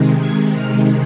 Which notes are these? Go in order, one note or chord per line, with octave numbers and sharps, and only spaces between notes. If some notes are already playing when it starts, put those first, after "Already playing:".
Already playing: C3 D#3 G#3
G#6
F6